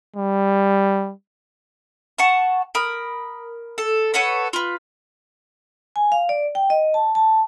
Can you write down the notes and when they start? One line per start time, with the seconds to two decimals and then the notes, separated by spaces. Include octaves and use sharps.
0.16 G3
2.18 F#5 A5 C#6
2.75 A#4 B5 D#6
3.78 A4
4.14 A4 B4 C#5 F#5
4.53 F4 B4
5.96 G#5
6.12 F5
6.29 D5
6.55 G5
6.70 D#5
6.94 A5
7.15 A5